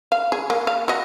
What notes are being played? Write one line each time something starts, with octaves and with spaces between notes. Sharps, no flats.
F5
G#4
A#3
F5
F#4 D#5